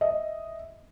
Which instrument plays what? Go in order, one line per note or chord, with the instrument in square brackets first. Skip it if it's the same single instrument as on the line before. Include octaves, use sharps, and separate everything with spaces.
[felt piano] D#5 E5